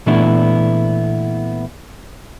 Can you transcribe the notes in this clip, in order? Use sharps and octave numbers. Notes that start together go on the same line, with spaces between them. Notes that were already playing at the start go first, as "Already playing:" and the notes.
A#2 E3 A3 B3 D4 E4